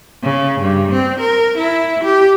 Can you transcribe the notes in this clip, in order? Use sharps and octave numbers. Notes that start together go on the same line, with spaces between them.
C#3
G2
C4
A#4
E4
G4